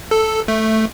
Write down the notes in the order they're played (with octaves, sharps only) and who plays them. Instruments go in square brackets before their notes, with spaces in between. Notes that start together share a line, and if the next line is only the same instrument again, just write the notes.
[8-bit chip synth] A4
A3